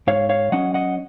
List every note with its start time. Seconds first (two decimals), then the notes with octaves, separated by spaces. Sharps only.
0.07 G#2 C#5 F5
0.29 C#5 F5
0.52 F#3 C#4 D#5 F#5
0.74 D#5 F#5